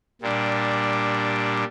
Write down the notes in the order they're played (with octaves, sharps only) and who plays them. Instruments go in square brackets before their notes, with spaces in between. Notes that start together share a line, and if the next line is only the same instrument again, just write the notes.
[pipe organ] A#2 G3 D4